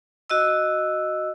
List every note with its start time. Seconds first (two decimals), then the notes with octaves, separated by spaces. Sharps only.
0.30 F#4 D#5 E6